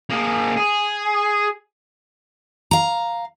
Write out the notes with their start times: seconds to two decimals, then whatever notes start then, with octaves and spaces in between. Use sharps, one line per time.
0.10 A#3 G#4
0.57 G#4
2.71 F5 A#5